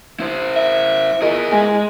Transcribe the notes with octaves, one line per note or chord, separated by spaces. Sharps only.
E4 C5
E5
E4 F4 G#4 A#4 D#5
G#3 G#5